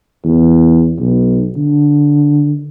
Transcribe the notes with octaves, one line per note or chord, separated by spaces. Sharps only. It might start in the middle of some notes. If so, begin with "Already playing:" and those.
E2
B1
D3